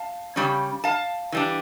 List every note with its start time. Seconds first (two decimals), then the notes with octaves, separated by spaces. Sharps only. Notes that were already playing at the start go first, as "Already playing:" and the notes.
Already playing: F5 A5
0.36 C#3 G3 C#4
0.84 F5 A5
1.32 E3 G3 D4